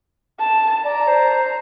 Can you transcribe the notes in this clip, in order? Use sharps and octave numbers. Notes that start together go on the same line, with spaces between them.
A5
D5 A#5
C5